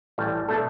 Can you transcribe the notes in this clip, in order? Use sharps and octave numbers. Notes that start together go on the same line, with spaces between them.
A1 A2 G3
B2 A3 D4 A4